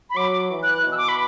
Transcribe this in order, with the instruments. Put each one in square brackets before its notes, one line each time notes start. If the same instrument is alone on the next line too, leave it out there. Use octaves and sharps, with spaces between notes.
[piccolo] B5
[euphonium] F#3 [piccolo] D6
[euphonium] E3
[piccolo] F#6
F#6
[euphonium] B2
[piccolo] E6
D6
B5